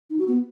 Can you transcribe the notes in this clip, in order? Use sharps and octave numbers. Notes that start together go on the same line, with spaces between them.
D#4
F#4
B3